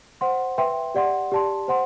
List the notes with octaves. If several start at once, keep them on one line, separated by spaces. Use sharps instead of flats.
C5 F#5 C6
B4 E5 G5 C6
G4 D5 F#5 C6
G4 D5 A5 C6
C5 F#5 C6